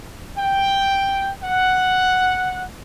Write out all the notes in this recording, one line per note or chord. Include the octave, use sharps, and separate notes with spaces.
G5
F#5